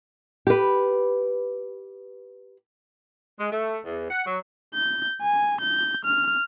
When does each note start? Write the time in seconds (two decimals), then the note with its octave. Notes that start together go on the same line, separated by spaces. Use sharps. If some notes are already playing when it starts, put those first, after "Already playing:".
0.47 G4 B4
3.40 G#3
3.52 A3
3.85 E2
4.10 F#5
4.26 F#3
4.74 G6
5.22 G#5
5.61 G6
6.05 F6